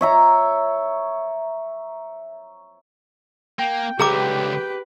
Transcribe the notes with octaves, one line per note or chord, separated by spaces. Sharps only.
C#5 E5 A#5
A#3 G5
C#2 D3 G4 G#4 B4 A#5 D6